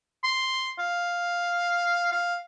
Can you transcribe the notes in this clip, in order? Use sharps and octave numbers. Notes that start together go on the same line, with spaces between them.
C6
F5
F5